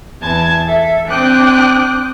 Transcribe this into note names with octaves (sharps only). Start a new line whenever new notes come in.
E2 A5 G#6
A4 E5
C4 D4 G5 D6 D#6 F#6